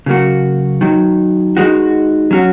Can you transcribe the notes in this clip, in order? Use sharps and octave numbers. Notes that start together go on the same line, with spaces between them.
C#3 F#3 A#3 F#4
D#3 F#3 D#4
D#3 G#3 D#4 F#4
F#3 C#4 F#4